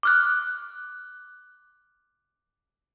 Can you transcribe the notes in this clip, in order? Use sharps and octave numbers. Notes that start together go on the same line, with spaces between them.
D6 F6 F#6